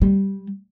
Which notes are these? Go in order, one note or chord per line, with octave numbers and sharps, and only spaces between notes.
G3